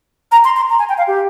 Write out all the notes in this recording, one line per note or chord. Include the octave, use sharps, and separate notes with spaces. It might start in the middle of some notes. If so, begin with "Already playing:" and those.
A#5
C6
C6
A#5
G#5
G5
F5
G4